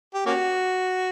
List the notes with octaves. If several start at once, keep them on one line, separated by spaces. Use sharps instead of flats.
G4
A#3 C#4 F#4